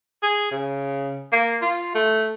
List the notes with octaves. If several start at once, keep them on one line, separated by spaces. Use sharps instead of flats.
G#4
C#3
A#3
F4
A3